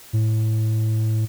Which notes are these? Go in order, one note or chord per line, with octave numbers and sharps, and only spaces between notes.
A2